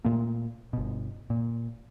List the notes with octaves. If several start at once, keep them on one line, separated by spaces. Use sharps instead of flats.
A#2 A3 A#3
G1 B2
A#2